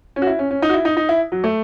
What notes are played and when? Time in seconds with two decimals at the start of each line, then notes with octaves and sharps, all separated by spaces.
0.16 C#4
0.22 F#4
0.27 E4
0.39 C#4
0.51 C#4
0.62 D#4
0.69 F#4
0.74 E4
0.85 D#4
0.97 D#4
1.09 E4
1.32 F#3
1.44 A3